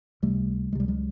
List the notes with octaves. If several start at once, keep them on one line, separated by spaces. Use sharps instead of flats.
C#2 C3 G3 A3
C#2 C3 G3 G#3
F#3 G#3